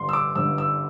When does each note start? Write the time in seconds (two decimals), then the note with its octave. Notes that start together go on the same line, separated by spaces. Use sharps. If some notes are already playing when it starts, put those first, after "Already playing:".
Already playing: G1 G2 D3 C6
0.09 E6
0.13 D6
0.35 G1 G2 D3 E6
0.58 E6